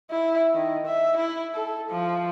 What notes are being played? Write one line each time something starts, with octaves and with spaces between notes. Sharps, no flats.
E4
D#3
E5
E4
A4
F3